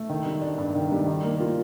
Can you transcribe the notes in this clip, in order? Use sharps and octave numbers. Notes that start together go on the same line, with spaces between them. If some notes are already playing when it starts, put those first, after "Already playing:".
Already playing: A3
D#3
G3
D4
G2
D#3
G3
D#3
A#3
F4